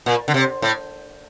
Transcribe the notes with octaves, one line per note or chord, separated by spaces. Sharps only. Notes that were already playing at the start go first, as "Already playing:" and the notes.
A#2
D3
C3
A2